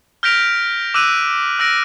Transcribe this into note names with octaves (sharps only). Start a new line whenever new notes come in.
F6 G6 A#6 B6 D7 F7
D6 E6 F#6 D#7 F7
E6 F#6 A#6 D7